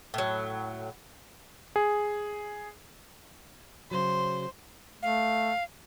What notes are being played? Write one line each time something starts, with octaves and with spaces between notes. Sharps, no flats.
A2 F#3
G#4
C#3 F#3 C5
A3 F5